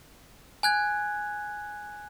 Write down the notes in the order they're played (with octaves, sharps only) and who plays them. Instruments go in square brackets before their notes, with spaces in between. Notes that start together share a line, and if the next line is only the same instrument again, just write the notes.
[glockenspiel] G#5 F#6 G#6